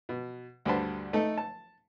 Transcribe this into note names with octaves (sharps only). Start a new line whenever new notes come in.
B2
D2 G2 D3 B4 C5 A5
A3 D#4 A4
A5